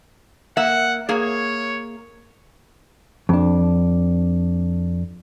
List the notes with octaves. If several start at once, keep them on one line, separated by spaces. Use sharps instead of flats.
A#3 E5 F#5
A#3 G#4 C#5
F2 D4